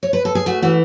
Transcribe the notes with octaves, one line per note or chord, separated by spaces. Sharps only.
C#5
B4
A4
G#4
A3 F#4
E3 F#4